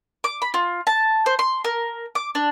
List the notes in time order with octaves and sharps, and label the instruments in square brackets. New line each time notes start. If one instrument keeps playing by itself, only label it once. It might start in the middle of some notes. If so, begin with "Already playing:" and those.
[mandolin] D6
B5
F4
A5
C5
C6
A#4
D6
D4